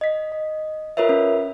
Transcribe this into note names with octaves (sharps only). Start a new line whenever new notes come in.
D#5 B6
D#5
F4 A#4 B4 C#5 E5
C#4